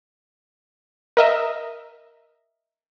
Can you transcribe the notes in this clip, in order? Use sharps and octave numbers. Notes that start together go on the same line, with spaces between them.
A#4 D#5 E5